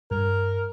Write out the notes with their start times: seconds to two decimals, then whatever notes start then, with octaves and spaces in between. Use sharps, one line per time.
0.11 G2 A#4